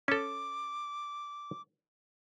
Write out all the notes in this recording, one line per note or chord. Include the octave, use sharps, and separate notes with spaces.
C#4 A4 D6